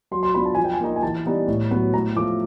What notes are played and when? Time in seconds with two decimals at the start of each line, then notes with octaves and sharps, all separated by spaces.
0.11 F#3 C6
0.23 C6
0.34 B3 D4 F4 B5
0.45 A5
0.55 F3 G#5
0.64 G5
0.73 G#5
0.80 A#3 D#4
0.96 G#5
1.03 E3 A5
1.26 G3 B3 D#4
1.48 A2
1.71 F#3 B3
1.94 A2 A#5
2.16 F3 A3 D6